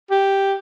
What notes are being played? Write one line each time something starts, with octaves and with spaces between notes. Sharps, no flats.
G4